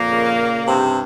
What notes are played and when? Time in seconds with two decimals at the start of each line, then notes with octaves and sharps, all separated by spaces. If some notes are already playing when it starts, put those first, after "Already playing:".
Already playing: F2 A#2 A#3
0.10 C#3
0.39 C#3
0.68 G2 C3 C4